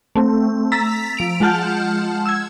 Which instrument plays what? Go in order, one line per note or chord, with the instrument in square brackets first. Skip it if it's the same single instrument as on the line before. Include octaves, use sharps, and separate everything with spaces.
[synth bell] A3 C4
A#5 E6 A6 B6
F3 D7 F7
G#3 F4 F#5 A5 F6 G6
E6 G#6